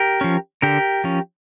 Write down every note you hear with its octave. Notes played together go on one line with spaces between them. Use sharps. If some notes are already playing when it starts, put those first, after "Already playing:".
Already playing: G4 A#4
F3 C#4
D3 G4 A#4
F3 C#4